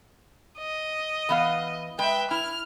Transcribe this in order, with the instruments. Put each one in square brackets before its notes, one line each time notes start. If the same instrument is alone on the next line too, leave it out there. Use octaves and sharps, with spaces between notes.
[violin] D#5
[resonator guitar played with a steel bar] E3 B3 F5
[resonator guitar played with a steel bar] G#3 B4 [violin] E5 G5
[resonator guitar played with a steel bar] E4 [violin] F6